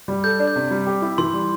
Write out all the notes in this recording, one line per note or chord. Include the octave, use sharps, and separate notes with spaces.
G3
A4 G6
D4
G6
C3
G3
G4
E4
E3 C6
G3